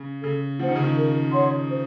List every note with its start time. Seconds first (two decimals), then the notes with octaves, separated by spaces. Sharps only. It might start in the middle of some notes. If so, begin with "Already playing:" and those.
Already playing: C#3
0.23 C#3 A4
0.59 F3 C5 F#5
0.68 D#3
0.75 C#3
0.84 D#3
0.96 A#4
1.32 C#5 F#5 C6
1.69 C5